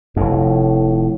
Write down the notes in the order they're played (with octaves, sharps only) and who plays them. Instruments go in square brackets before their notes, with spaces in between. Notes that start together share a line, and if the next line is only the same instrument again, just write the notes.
[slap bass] F1 F2 [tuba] A2